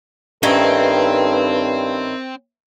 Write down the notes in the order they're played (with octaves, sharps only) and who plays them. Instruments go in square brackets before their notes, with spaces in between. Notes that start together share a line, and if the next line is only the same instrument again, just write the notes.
[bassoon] G2 [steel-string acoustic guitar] D#3 C#4 E4 [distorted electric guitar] C4 [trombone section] D#4 A4 B4